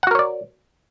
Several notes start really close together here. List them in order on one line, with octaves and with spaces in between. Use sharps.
F#5 F#4 A#4 C#5 D5